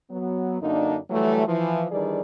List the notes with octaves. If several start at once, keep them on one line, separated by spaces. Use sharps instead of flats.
F#3 B3
F#2 D3 A#3 D4 D#4
E3 F#3 G3 A3
E3 F3
D#3 E3 G3 D4 G#4 D5